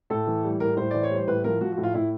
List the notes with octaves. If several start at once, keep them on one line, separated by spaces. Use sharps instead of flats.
A2 A4
E3
G3
A2 A#4
A2 C5
E3 D5
C#5
G3
C5
A2 B4
F3 A#4
F3 F#4
F#4
A2
F4
A2 E4